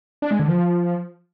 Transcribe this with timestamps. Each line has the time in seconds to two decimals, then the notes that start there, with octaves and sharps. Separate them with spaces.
0.22 D4
0.31 G#3
0.39 D3
0.48 F3